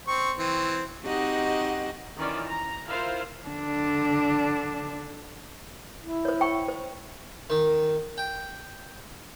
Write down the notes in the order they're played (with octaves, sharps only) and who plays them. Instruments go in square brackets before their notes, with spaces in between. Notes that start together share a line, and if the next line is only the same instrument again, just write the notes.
[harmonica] C4 C#6
E3 C4
[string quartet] C4 D#4 F#4 G4 D#5 F#5
[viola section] D#3 E3 C#4 F4 D5
A#5
E4 F4 A#4 C5 F5
[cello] D3 D4
[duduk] E4
[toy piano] C5 C#5
G5 C#6
C5
[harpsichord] D#3
G5